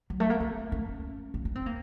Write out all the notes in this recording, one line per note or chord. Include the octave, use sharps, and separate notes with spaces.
F#3
A3
A#3
C4
C#4
C4
C#4
C4
A#3